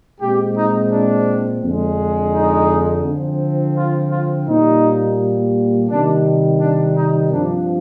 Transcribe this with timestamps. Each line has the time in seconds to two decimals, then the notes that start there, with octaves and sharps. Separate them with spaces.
0.20 A#2 G#3 C4 G4
0.56 D#4
0.92 D4
1.63 F2 D3 G#3
2.33 D#4
3.05 D3 F3 C4
3.76 F4
4.11 F4
4.47 A#2 G3 A#3 D#4
5.89 C3 D#3 G3 D4
6.60 D4
6.96 D#4
7.31 G2 F3 C4 D4